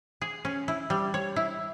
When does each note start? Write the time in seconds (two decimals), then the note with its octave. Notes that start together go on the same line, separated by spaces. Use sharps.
0.21 G#4
0.45 C#4
0.68 E4
0.90 G3
1.14 C#5
1.36 E4